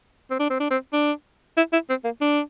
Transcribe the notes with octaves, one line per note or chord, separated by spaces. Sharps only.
C4
D4
C4
D4
C4
D4
E4
E4
C4
A#3
D4